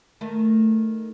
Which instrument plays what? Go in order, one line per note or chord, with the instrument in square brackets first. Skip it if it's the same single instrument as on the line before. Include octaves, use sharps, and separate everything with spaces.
[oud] D#3 A3